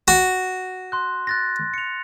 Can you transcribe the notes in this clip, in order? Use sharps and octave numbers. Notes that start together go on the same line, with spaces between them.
F#4
C6 F#6
F#6 A6 A#6
C#7 F7